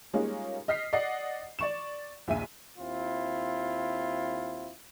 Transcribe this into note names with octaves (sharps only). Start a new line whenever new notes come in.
G3 G#3 A#3 C#4 D#4 F4
D#5 F6 B6 C7
D5 D#5 F#5 C7
D5 C#6 E7
A#1 D#2 E5 G#5 D#7
D#2 C4 E4 F4